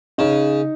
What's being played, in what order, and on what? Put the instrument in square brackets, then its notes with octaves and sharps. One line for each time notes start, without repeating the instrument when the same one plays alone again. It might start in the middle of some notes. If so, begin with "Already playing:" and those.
[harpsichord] C#3 [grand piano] D#4